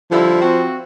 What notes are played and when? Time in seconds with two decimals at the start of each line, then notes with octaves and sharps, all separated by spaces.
0.11 D3 F3 G3 E4
0.42 C4 F#4